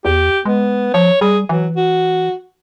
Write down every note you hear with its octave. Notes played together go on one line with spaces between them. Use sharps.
E2 G4
G#3 B3
F3 C#5
G3 G#4
E3 F#3
F#4